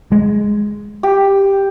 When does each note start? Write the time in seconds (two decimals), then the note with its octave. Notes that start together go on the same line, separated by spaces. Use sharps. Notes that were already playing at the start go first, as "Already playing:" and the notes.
0.12 G#3
1.03 G4